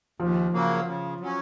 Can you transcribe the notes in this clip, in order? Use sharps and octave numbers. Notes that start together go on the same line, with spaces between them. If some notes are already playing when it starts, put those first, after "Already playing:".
D#2 F3
C#3 F#3 A#3
C#3
F#3 C#4